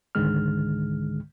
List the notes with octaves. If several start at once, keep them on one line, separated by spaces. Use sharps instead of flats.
C#2 G#2 D3 D#3 G#3 F6